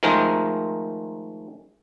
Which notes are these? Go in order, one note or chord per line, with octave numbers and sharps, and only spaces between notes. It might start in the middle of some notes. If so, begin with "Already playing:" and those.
D#3 F3 G#3 A3 A#4 C5